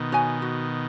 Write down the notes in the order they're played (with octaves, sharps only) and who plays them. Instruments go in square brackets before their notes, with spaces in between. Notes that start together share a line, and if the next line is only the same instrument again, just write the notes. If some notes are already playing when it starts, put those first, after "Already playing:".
Already playing: [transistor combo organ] B2 D#3
[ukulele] F#4 C#5 G#5
F#4